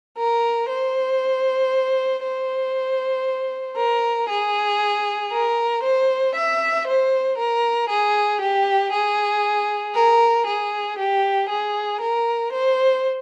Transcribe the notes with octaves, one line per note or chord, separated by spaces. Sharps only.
A#4
C5
C5
A#4
G#4
A#4
C5
E5
C5
A#4
G#4
G4
G#4
A#4
G#4
G4
G#4
A#4
C5